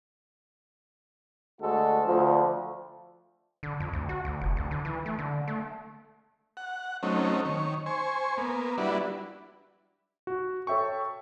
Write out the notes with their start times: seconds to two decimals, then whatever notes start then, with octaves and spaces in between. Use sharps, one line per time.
1.60 D2 G#3 F#4 A4
2.05 D2 F3
3.63 D3
3.80 F2
3.93 D2
4.09 F#4
4.25 D2
4.41 F1
4.57 D2
4.71 D3
4.85 E3
5.06 A3
5.19 D3
5.47 A3
6.57 F#5
7.03 F#3 A3 C4 C#4 D#4
7.45 D#3 C#5
7.86 C5 G#5 C#6
8.38 A#3 B3
8.78 G3 D4 E4 F#4 B4
10.27 F#4
10.67 A4 C#5 E5 G5 C#6